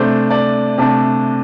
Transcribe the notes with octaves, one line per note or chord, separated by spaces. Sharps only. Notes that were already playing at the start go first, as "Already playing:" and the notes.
Already playing: C3 A3 D4 C5
D5
C3 A3 D4